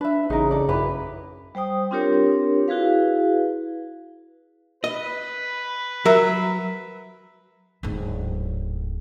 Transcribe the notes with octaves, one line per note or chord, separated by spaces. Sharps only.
D4 B4 E5
A1 C#3 D#4 A#4
A4 D5
F#2 E4 G4 B4
G3 C5 G5 D#6
C4 D4 F4 G4 A#4 C#5
E4 F#4 G#4 B4 F5
B4 D#5
F#3 A#4 E5
D1 G#2